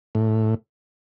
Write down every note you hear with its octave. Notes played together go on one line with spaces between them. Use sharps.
A2